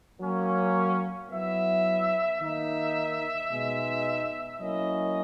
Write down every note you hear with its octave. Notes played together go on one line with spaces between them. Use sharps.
F#3 A#3 C#4
F#3 B3 E4 E5
D#3 A#3 D#4 E5
B2 G#3 D#4
F#3 A#3 C#4 E4 D#5